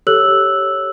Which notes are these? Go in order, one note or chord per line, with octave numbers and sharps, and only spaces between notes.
G4 A4 C#5 E6 F#6 F#7